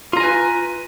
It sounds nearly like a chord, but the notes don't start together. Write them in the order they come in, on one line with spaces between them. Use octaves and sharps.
F4 A#5 G#5 B4